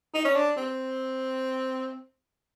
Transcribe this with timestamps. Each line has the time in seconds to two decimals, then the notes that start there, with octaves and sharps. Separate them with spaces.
0.14 D#4
0.25 C#4
0.35 D4
0.57 C4